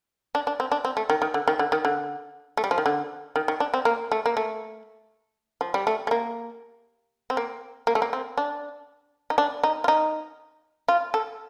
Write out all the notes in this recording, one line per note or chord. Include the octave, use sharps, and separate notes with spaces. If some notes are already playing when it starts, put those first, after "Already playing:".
D4
D4
C4
D4
C4
A3
D#3
D#3
D3
D#3
D3
D#3
D3
A3
G3
F3
D#3
D3
D#3
D#3
D4
C4
A#3
A3
A#3
A3
F3
G3
A3
A3
A#3
C4
A#3
A#3
A3
A#3
C4
D4
D#4
D4
D#4
F4
D#4
F4
A4